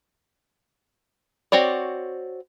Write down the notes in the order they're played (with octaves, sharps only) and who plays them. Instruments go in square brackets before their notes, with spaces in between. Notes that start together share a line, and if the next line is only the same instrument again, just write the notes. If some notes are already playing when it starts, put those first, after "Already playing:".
[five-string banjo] C4 F#4 C#5 D5